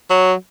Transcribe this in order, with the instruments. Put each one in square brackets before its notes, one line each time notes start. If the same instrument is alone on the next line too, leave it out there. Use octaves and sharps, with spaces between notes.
[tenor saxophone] F#3